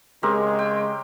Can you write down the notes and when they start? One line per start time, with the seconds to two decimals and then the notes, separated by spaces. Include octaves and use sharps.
0.23 C#3 G#3 C4 G4 A#4
0.59 G5